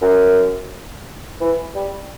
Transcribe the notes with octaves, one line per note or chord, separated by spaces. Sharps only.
F#2
E3
G3